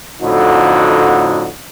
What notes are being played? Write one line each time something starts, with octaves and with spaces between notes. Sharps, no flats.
F2 A2 D3 D#4 F#4